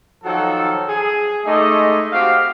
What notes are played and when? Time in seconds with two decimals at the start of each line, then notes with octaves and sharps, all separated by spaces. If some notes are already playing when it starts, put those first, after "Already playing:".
0.24 D#3 F3 F#3 F#4 A4
0.88 G#4
1.45 G#3 A3 D#4 G#4 D5 D#5
2.13 C4 F#4 G4 F5